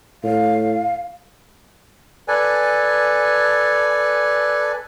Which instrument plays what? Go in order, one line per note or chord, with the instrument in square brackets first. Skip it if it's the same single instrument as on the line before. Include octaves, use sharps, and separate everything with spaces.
[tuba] A2 [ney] F5
[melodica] A4 B4 D5 G#5